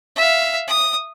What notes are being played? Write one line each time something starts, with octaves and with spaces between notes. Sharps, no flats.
E5 F5
D#6